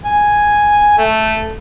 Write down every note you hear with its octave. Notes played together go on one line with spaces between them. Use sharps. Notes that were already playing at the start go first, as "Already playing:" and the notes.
G#5
A3